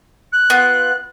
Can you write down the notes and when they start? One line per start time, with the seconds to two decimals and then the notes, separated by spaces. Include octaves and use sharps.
0.32 F#6
0.50 B3 F4